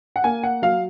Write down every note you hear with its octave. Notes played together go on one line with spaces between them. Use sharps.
F#5
A#3 G#5
F#5
F#3 F5